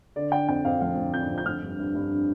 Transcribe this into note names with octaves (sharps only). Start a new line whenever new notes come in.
D3 D5
D3 G5
F2 G5
F2 F5
F3 F5
F3
F2 G6
F2
G6
F3 F6
G2
G2
G2